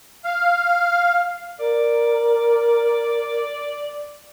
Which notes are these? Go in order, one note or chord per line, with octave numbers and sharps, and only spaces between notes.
F5
A#4 D5